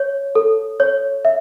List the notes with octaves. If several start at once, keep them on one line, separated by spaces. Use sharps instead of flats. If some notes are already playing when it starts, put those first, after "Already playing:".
Already playing: C#5
A4
C#5
E5